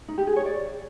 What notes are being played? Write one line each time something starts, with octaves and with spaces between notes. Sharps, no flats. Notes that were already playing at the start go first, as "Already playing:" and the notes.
D#4
G4
G#4
C#5
D5